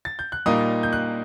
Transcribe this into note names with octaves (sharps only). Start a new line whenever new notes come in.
A6
G6
F#6
A#2 G3 A#3 D#4 D#6
G6
F#6